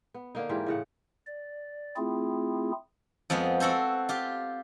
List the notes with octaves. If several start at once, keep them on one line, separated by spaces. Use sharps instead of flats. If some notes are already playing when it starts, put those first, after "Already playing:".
B3
D3 A#3 D#4
G#2 E3 F4 G4
A2 C#3 F#5
D5
A3 C4 E4 F4 G#4
F2 F3 G#3 B3
C4 F#4 A4 C5
F4 G4